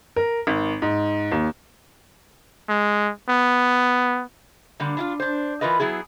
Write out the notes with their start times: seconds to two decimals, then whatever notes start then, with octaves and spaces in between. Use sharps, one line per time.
0.16 A#4
0.47 G#1
0.82 G#2
1.32 D#2
2.69 G#3
3.29 B3
4.80 D3 G3 A#3
4.97 D4 E4 F4
5.20 D4 C5
5.61 E3 F4 A#4 B4 D#5
5.80 F#3 B3 E4 G#4